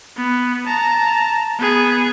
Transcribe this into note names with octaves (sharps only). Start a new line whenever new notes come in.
B3
A5 A#5
B3 G#4